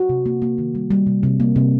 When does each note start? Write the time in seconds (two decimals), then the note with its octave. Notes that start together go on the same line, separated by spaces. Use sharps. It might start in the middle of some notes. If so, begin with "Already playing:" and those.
Already playing: F#4
0.09 C3
0.26 A#3
0.42 A#3
0.58 D#3
0.75 G3
0.91 G3
1.07 C3
1.23 C3
1.40 A#3
1.56 C3